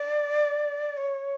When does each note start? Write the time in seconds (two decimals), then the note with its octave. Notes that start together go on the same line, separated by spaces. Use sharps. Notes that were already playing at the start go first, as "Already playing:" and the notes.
Already playing: D5
0.97 C#5